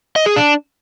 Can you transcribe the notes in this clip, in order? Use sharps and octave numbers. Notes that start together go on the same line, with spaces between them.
D#5
G#4
D4